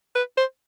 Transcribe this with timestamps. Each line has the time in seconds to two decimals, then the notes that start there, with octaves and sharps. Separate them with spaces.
0.15 B4
0.37 C5